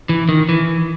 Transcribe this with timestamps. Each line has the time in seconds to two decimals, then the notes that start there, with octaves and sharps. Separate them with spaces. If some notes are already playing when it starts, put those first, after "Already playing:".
0.09 E3
0.29 D#3
0.49 E3